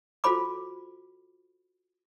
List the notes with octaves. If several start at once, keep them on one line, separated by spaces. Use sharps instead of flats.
F4 F#4 A4 C5 B5 D6